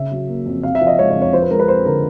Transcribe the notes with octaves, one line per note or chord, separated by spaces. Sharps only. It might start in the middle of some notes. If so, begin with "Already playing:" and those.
Already playing: C#3 E5
F#3
A#3
F2
C3 F5
E5
F3
D#5
G#3 C#5
C#5
F2
C#5
F3 C5
B4
G#3 A#4
B4
C4 C5
D3 A#4